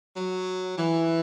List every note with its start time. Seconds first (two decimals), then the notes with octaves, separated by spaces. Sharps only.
0.17 F#3
0.77 E3